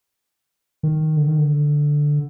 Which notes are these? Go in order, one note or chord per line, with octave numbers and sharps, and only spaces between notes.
D#3
D3
D#3
D3